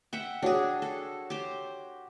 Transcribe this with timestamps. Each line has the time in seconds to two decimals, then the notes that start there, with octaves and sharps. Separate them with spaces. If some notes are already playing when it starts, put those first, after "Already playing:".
0.13 E5 F#5 G5
0.42 D4 F#4 G#4 C#5 G5
0.82 A4
1.30 G4 C5